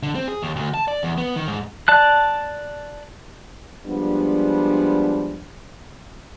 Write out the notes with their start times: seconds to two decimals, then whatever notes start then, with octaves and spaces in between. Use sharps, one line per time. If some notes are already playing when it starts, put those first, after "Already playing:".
0.03 D3
0.15 C4
0.28 G#4
0.43 D#2
0.56 D2
0.74 A5
0.88 D5
1.03 E2
1.18 B3
1.36 D#3
1.48 G#2
1.88 D5 A5 F#6
3.86 F3 G3 G#3 B3 D4